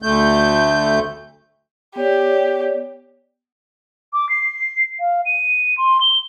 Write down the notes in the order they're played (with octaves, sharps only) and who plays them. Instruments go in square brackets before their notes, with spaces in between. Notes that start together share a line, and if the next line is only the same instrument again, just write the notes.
[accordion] D2 A3 G6
[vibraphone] B3 C#5 D5 [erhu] G4
[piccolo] D6
C7
F5
D#7
C6
G7